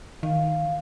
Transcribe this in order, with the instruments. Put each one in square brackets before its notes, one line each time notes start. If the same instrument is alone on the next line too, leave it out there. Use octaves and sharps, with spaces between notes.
[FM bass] D#3 [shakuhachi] F5